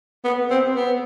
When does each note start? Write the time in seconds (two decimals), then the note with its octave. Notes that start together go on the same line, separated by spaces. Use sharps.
0.25 B3
0.51 C4
0.76 B3